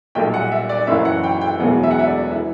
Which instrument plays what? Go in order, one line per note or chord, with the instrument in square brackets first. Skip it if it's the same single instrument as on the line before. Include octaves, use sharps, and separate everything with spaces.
[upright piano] B1 A#2 G3 A#3 G5
F#5
E5
D5
F#1 F#2 E3 A#3 E5
F#5
G5
G5
E1 E2 B2 F#3 A#3 F#5
E5
F#5
E5
D5
E3 E5